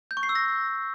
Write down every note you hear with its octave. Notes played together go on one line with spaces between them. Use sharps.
G6
C#6
C7
E6
A#6